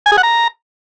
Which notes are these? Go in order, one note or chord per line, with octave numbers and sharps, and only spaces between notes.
G#5
G#4
F#5
A#5